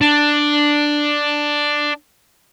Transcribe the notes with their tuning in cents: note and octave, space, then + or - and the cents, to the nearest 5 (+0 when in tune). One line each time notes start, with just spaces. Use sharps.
D4 +5